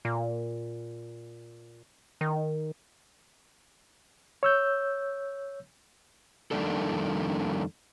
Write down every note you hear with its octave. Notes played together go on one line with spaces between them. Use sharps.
A#2
D#3
C#5 E6 G6
F2 D#3 G3 A#3 D4 A4